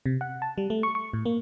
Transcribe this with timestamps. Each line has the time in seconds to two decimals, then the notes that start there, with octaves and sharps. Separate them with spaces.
0.06 C3
0.21 F#5
0.42 A5
0.58 G3
0.70 A3
0.83 C#6
0.95 C#6
1.13 A2
1.26 A#3